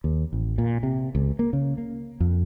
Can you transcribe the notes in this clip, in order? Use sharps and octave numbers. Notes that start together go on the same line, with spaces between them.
D#2
A1
A#2
C3
C#2
A#3
C#3
A#3
F2